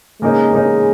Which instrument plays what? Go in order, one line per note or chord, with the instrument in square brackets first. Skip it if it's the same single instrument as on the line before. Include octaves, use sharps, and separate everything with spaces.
[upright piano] C#3 A#3 D#4 [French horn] G#3
[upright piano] C#3 A#3 D#4